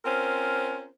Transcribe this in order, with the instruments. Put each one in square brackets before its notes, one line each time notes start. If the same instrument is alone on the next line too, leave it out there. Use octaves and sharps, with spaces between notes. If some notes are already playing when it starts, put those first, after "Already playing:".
[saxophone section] C4 C#4 F4 A#4 C5